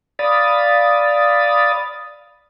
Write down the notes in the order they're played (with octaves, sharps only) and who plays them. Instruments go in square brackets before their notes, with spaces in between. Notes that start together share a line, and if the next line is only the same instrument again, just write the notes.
[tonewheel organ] D5 F5 B5 D#6 A6